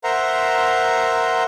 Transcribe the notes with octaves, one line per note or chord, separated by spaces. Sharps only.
A#4 C5 E5 F#5 A#5 C6